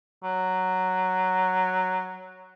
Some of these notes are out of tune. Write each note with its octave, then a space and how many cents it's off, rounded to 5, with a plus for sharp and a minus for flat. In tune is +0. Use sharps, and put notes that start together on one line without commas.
F#3 +5